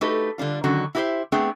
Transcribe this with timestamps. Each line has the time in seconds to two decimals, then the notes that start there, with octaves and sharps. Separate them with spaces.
0.01 A3 D#4 F#4 G4 A4 B4
0.38 D3 G3 D4 F4
0.64 D3 D#3 F#3 C#4 F#4
0.95 E4 F#4 G4 B4 C5 E5
1.32 A3 B3 C4 D4 G#4 G5